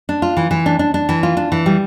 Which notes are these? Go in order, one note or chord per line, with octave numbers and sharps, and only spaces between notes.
D4
F4
E3
E3
D4
D4
D4
E3
F4
D4
E3
G3